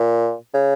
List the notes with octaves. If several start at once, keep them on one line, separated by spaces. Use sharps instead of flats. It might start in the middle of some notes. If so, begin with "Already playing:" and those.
Already playing: A#2
C#3